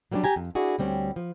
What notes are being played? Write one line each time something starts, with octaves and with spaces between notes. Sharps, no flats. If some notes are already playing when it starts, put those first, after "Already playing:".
F#3 G3 A#3 C#4 D4
G4 G#5 A#5
F2
D4 E4 F#4 G#4
D2 G3 C4 C#4
F3